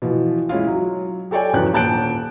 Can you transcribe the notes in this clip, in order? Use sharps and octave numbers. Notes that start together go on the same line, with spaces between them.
B2 E3 F3
G#3 C#4 E4 F4
F#3
G4 A4 C#5 D5 G5 G#5
E2 F3 F#3 C#4 D4 F#6
D#1 G#5 A5 F#6 G6 D7